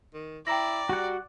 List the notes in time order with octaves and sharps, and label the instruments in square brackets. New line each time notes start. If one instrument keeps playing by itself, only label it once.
[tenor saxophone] D#3
[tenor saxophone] E4 [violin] D5 [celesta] G5 A#5 A#6
[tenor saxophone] G3 [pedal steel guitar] F#4 F#5